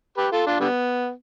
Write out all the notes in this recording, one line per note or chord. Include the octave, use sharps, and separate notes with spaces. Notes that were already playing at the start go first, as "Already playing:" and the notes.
G4 B4
F4 A4
D4 F4
D3 G3 B3